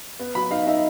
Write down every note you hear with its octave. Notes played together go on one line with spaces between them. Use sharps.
B3
F#3 B5
D#4 F5
D#4 E5